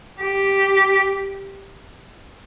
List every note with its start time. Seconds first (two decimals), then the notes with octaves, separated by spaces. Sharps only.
0.21 G4